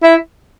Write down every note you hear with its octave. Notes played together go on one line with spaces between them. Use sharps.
E4